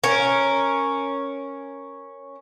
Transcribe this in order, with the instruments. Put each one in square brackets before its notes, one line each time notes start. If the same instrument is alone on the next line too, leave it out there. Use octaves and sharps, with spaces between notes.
[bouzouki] C#4 A#4